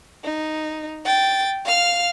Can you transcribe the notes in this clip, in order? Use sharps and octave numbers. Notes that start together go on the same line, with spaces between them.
D#4
G5 A6
F5 F6